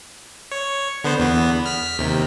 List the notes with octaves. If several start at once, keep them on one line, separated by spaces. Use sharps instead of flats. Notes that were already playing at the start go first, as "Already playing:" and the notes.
C#5
D3 B3 C5
E2 B3
F6 B6
D#2 C3